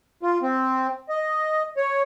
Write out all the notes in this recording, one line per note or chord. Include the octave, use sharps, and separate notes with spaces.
F4
C4
D#5
C#5